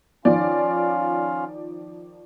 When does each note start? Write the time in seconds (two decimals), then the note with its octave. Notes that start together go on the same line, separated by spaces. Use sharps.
0.25 D#3 F3 C#4 F4 D5 F5